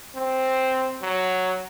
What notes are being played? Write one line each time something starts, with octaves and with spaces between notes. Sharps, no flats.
C4
F#3